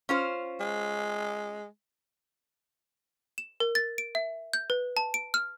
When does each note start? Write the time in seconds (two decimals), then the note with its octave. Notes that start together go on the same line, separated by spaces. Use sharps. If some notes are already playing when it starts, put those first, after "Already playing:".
0.09 C#4 F4 C5
0.60 G#3
3.38 E7
3.60 A#4
3.75 A6
3.98 D7
4.15 E5
4.53 G6
4.70 B4
4.97 A5
5.14 D7
5.34 F6